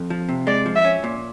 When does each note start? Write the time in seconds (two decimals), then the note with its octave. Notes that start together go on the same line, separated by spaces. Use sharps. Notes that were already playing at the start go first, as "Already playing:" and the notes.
Already playing: F2
0.10 F3
0.29 C3
0.47 G#3 D5
0.66 F3
0.76 E5
0.85 C#4
1.04 A#2